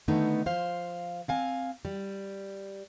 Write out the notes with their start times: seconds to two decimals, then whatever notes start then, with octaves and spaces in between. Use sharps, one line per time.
0.08 D3 D#3 A3 B3 D#4
0.46 F3 C5 F5
1.28 C4 F5 G#5
1.85 G3